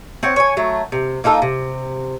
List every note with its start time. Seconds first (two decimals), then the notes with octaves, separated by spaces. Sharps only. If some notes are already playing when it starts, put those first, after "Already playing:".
0.23 C4 C#5 F#5
0.36 C#5 G#5
0.57 F#3 A3
0.92 C3
1.24 A#3 D#4 F4 A4
1.42 C3